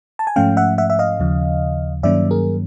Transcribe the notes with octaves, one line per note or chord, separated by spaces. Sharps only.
A5
G#5
G#2 F3 A3 C#4 F5 G5
E5 F#5
E5 F#5
E5
D#5 F5
D#2 C#3 F3
G2 D#3 F#3 A#3 C#4 D5 E5
G#4 A#4